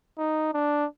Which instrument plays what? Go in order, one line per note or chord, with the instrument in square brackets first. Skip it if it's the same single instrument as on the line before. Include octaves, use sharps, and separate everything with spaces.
[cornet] D#4
D4